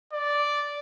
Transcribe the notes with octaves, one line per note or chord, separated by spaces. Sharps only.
D5